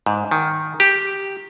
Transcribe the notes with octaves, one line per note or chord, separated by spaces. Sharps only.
G#2
D#3
G4